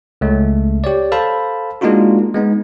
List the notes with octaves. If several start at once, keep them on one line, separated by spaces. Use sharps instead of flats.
C#2 A3
G4 C#5 D5
A4 C5 F5 A5 B5
G#3 A#3 D4 D#4 F4 F#4
G#3 B3 D#4